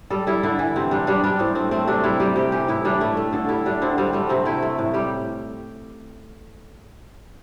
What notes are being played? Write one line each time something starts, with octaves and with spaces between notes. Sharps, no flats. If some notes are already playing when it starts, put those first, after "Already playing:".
G3 A4
G3 E4
D3 E4
E3 E4
C3 C4
G3 D4
G3 D4
G3 D4
A2 C4
A3 C4
A3 C4
C3 D4
G3 E4
G3 G4
C3 G4
E3 G4
A2 E4
G3 D4
A3 E4
A3
D3 A4
G3 E4
G3 D4
D3 C4
G3 C4
G3 A3
C3 C4
A3 E4
A3
A2
G3 G4